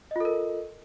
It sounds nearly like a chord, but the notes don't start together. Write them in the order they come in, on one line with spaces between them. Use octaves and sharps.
D#5 F4 A4 A#4